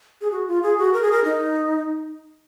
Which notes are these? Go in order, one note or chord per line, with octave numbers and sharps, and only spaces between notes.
G#4
F#4
F4
G#4
F#4
A#4
G#4
A#4
D#4